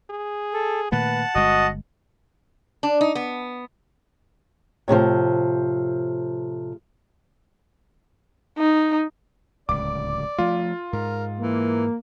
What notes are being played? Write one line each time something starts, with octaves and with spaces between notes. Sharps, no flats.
G#4
A4
A#2 D#3 A3 B4 F#5 A5
G1 G#3 F#4 D#5
D4
D#4
B3
A2 C3 D#3 F3
D#4
D1 C#2 D5 D6
F3 A3 F4
G#2 A#4
E3 A#3